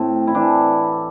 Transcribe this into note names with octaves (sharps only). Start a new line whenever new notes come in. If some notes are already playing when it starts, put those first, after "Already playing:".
Already playing: A2 A3 C4
E4
E3 D4